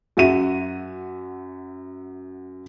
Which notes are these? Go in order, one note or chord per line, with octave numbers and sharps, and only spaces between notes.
F#2 F#4 E5 D#7